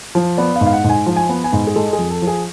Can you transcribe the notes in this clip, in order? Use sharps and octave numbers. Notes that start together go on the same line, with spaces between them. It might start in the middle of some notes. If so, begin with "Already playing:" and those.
F3
B3 D5
F5
G#2
F5
F#5
G#2
G#5
F3
G#5
B3
G#5
G#2
G#4
G#3 A4
G#4
F2
A4
F3
G#4